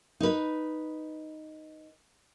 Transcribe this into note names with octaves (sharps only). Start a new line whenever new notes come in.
D#4 B4